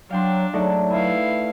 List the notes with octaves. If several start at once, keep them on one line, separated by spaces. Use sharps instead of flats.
F#3 D4 F5 G5 C6
F#3 A3 D#4 D5 F#5
E4 B4 E5 F5